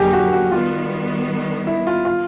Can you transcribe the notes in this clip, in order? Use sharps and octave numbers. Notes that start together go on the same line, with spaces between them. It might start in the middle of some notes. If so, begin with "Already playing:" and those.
Already playing: F2 D3 F#3 A#3 D#4 G4 G#4
F#4
F#4
D#3 G3 B3 F4
E4
F4
F4